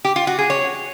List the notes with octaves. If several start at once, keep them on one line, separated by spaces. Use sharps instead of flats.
G4
F4
F#4
G#4
C#5